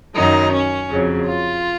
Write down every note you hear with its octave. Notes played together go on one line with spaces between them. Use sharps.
F#2 D#3 F#3 D#4
C#4
F2 C#3 F#3
F4